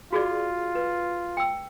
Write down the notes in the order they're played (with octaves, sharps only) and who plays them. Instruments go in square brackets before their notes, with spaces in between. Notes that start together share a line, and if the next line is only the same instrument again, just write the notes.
[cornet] F4 [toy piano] F#4 G#4 D5
[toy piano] B4
G5 E6